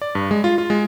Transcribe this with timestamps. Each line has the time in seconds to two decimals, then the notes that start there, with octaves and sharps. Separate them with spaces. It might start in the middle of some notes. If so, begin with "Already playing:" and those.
0.02 D5
0.15 G2
0.31 G#3
0.44 F4
0.58 F4
0.70 G#3